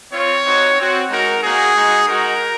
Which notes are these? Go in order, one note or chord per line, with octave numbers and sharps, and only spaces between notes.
C4 F4 C#5
C4 D#4 F#4
C4 F#4
G#3 D#4 F#4 A#4
A#3 D#4 F#4 G#4
G#3 D#4 F#4
G#3 D#4 F#4 A#4